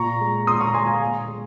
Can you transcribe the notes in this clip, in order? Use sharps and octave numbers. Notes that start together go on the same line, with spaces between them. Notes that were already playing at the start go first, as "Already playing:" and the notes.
Already playing: A#2 A#5 C#6
G#3
A#2 C6 D#6
A#5 C#6
G#3 G#5 C6
F5 G#5
A#2
G#3